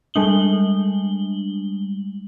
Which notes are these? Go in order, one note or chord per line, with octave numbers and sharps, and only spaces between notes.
G3 G#3 D4 F#7 G7